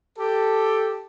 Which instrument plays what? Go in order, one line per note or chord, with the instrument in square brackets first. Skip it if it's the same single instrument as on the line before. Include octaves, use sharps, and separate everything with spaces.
[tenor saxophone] G4 [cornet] A4